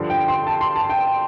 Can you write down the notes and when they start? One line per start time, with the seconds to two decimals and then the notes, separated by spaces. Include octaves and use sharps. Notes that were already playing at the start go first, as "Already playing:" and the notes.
Already playing: G2 D3 F3
0.10 G5
0.28 C6
0.47 A5
0.61 C6
0.76 A5
0.89 G5